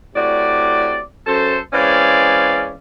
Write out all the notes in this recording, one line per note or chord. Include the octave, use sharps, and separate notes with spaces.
A2 C3 F#4 D5
F#2 A4 C5
E3 G#3 C4 C#4 D5 F5